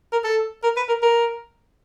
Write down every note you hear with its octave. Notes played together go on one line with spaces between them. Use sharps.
A#4
A4
A#4
B4
A#4
A#4